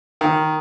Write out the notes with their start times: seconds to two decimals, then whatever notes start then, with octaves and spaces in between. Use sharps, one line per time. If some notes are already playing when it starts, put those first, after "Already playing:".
0.21 D#3